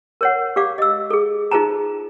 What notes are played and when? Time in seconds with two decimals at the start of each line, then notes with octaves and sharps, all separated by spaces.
0.21 A#4 C#5 F#5
0.56 G4 D5 F5 D6
0.78 D#5 E6
1.10 G#4 A4
1.51 D#4 F4 G#4 C5 A5 A#5